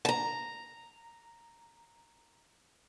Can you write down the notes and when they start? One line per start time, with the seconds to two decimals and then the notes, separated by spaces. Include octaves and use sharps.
0.05 A5 A#5